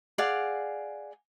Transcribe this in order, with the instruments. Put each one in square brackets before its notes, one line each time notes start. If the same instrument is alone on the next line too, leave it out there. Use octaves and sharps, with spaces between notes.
[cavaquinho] G#4 D5 F5 F#5